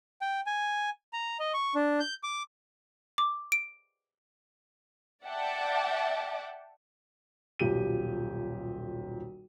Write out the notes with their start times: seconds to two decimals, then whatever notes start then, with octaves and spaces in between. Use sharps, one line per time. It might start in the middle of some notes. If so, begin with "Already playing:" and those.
0.21 G5
0.46 G#5
1.13 A#5
1.39 D#5
1.54 C#6
1.75 D4
2.00 G6
2.23 D6
3.18 D6
3.52 D7
5.25 D5 E5 F#5 G5 A5 D6
7.59 D#1 B1 F3 G4 D#7